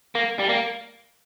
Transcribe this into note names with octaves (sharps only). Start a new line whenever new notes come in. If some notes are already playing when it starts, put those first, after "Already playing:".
A#3
G3
A#3